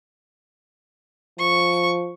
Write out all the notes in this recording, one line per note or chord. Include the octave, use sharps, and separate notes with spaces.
F3 C#6